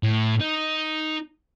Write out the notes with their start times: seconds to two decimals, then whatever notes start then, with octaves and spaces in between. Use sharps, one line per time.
0.03 A2
0.40 D#4